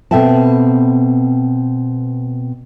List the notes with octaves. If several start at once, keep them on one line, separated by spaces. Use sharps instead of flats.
B2 C4 A4 E5 G5 A5